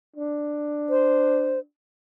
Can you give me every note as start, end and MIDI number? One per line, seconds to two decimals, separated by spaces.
0.16 1.62 62
0.90 1.59 72